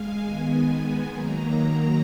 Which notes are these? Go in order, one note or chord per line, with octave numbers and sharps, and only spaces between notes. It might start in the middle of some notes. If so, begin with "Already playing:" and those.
Already playing: G#3 F5 G#5
D#3 G#3 B3
D#3 F#3 A#3 A#5